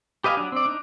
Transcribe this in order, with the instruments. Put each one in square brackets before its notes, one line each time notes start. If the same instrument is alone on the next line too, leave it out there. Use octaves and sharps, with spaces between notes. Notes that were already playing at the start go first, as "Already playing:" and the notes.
[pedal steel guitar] G4 B4 D#5 F5 G#5
F#3 D4
C4 D5
D4 D#4